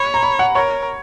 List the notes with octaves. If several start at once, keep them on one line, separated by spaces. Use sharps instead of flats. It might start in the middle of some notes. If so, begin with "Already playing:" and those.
Already playing: C#5 B5
A#5
B5
F#5
A#4 C#5